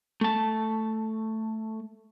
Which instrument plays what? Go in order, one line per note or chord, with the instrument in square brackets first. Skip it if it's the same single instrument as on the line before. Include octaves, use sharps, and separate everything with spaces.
[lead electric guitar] A3 A5